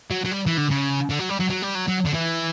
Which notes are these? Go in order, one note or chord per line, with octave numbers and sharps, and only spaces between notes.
F#3
F#3
G3
E3
D3
C#3
D3
F#3
G3
F#3
F#3
G3
F#3
F#3
D3
E3